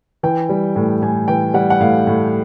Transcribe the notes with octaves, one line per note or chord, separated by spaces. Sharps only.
E3 G5
G3
A2
A2 G#5
E3 G5
G3 F#5
F#5
A2 F5
A2